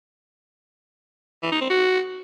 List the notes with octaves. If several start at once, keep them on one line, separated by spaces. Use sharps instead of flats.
E3
D#4
C4
F#4